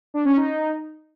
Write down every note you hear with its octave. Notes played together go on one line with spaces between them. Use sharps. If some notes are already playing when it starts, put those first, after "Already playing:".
D4
C#4
D#4